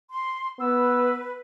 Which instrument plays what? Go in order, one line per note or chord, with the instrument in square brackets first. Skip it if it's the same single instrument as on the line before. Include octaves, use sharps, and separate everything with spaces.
[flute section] C6
[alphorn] B3 [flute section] B4 [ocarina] E6